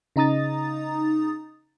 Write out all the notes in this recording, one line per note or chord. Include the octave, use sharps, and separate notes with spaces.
C#3 D#4 A#5 D#6 A6